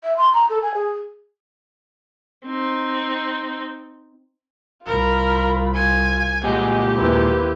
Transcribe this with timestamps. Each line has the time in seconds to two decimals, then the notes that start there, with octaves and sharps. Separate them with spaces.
0.04 E5
0.17 C6
0.33 A#5
0.50 A4
0.62 G#5
0.74 G#4
2.45 C4 D#4
4.86 C2 F4 A#4 B5
5.74 F4 G#5
6.44 A#2 G#3 F#4 G4 D#5 G#5
6.97 D#2 C4 E4 B4